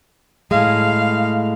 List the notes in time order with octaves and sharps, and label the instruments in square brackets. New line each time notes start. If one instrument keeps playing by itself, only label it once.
[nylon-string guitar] A2 G#3 [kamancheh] F5